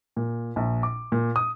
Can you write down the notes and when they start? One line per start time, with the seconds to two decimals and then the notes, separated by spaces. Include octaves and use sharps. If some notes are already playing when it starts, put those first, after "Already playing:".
0.17 A#2
0.56 A#1
0.83 D6
1.12 A#2
1.36 D#6